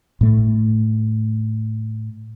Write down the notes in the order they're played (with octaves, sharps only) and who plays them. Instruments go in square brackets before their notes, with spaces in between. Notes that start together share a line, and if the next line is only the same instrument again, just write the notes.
[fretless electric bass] A2 A3